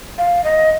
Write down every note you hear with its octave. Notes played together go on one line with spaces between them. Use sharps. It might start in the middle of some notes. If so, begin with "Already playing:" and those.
F5
D#5